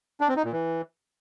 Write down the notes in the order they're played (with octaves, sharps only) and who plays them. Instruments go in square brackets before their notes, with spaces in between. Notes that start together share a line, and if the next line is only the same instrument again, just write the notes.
[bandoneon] D4
C4
D#4
A#2
E3